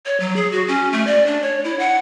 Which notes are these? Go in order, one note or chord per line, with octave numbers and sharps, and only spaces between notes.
C#5
F#3
G#4
F#4
C#4
A3
D5
D4
C#5
E4
F#5